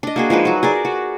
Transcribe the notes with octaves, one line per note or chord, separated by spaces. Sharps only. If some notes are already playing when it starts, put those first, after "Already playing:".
D4 D#5
A#3 F#4 G#4
F3 G#3 D#4 B4
F#3 F#4
G#4 A#4 D5
F#4